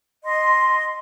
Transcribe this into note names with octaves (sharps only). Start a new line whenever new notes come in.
D#5 C6